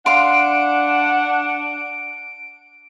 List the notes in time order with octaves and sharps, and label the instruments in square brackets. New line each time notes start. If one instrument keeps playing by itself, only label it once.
[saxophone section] D4 F#5 [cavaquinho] F5 C6 [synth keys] D7